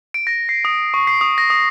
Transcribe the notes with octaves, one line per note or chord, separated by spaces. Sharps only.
D7
A#6
C7
D#6
C#6
C7
D#6
A#6
D#6